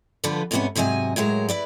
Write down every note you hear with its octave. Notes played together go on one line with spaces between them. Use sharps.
D3 F3 G3 B3 B4
G#2 C3 G3 A#3 B3 C#4
G#2 C3 F#3 D#5 G#5
A2 F#3 G#3 A#4
E4 B4 D5